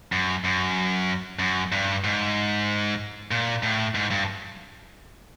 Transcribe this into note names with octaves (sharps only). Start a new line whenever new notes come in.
F#2
F#2
F#2
G2
G#2
A#2
A2
G#2
G2